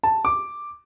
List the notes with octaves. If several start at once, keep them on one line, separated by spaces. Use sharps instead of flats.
A5
D6